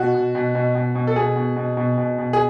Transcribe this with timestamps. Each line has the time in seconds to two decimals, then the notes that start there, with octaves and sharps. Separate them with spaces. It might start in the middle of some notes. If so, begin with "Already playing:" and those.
Already playing: B2 F#4
0.14 B2
0.35 B2
0.55 B2
0.75 B2
0.95 B2
1.07 A4
1.16 B2 G#4
1.36 B2
1.57 B2
1.77 B2
1.98 B2
2.18 B2
2.33 G#4